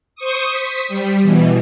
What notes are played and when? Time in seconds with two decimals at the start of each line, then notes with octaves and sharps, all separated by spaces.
0.16 C5 C#6 D#6
0.50 B6
0.88 G3
1.22 B2 E3